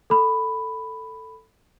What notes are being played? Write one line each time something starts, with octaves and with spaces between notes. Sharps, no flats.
A4 B5